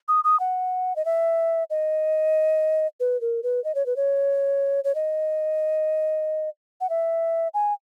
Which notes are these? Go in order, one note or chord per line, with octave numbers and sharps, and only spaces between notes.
D#6
D#6
F#5
D#5
E5
D#5
B4
A#4
B4
D#5
C#5
B4
C#5
C#5
D#5
F#5
E5
G#5